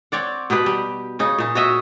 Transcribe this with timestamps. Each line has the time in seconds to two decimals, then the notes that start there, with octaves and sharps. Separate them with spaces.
0.12 C4 C#5 D5 F#5
0.50 B2 D#4 G4 B4
0.66 G3
1.19 C#3 C#4 D#4
1.38 A#2 D#4
1.55 F#4 C#5 D#5 E5